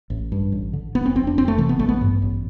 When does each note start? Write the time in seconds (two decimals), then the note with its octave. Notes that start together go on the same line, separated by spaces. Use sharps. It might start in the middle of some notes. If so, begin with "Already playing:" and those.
0.10 A1
0.32 G2
0.52 A1
0.73 D3
0.95 F1 B3
1.06 C4
1.16 F2 C4
1.27 D4
1.37 F1 C4
1.48 A3
1.58 C3 E3
1.69 B3
1.79 A1 A3
1.89 B3
2.01 G2
2.22 A1